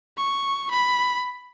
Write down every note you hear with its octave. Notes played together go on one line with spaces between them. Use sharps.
C#6
B5